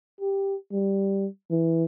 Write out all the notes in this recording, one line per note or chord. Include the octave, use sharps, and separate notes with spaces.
G4
G3
E3